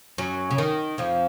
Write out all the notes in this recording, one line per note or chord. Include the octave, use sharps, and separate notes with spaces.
F#2 F#3
C#3
D#3
F2 F3